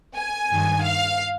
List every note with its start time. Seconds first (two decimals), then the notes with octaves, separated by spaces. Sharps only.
0.17 G#5
0.51 G2 D#3
0.84 F5